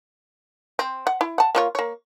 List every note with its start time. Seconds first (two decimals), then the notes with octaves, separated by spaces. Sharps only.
0.79 C4
1.07 F#5
1.21 E4
1.38 F#5 A5
1.55 A#3 F4 C#5
1.75 A#3 C#5